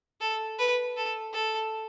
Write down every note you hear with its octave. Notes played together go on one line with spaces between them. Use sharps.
A4
B4
A4
A4